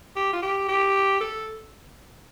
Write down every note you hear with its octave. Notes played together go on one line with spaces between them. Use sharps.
G4
F4
G4
G4
A4